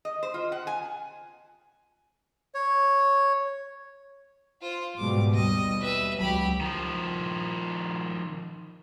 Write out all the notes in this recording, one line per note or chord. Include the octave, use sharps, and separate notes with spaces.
D#5
C5
F4
F#5
G#5
C#5
F4 C5
G#2 B2 G3 D6
D#2 G3 D#5
B4 E5
C#2 F#3 G4 B5
D#3 F3